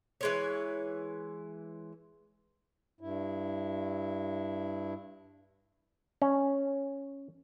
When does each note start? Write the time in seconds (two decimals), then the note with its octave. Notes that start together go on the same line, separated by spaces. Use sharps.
0.21 E3 G#3 C#5
3.01 G2 E4
6.22 C#4